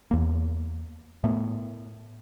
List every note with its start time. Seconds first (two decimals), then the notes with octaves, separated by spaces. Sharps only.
0.11 E2 A#3
1.24 A2 A3 B3